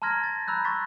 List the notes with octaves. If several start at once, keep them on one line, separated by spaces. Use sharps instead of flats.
A5 A#5 C6 F6 G#6 A#6
A6
A#5 B5 E6 F#6 G6
C6 C#6 A6 B6